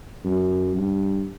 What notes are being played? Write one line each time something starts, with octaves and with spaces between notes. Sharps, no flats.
F#2
G2